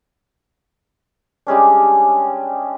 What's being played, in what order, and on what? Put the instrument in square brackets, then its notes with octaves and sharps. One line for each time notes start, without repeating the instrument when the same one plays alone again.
[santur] G3 G#3 C#4 D4